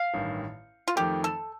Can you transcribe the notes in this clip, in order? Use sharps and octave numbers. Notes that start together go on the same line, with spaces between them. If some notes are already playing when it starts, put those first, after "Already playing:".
Already playing: F5
A1 G2 D#3
F4
F2 D#3 A3 G4
A4